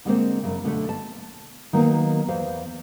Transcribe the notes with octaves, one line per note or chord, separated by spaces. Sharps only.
D3 G#3 A#3 C4
F#2 C#3
B2 D3 G#3 A3
A5
D#3 F#3 A#3 B3 D4 D#4
E2 C5 F5